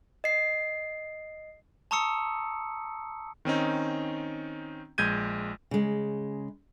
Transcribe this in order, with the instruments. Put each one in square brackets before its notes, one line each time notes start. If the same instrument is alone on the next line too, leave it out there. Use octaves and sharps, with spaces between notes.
[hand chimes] D#5 C7
[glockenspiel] A5 A#5 C#6 D#6 E6 C#7
[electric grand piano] D#3 C4 C#4 D#4
A#1 G#3 G6 G#6 D#7
[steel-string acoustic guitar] C#3 G#3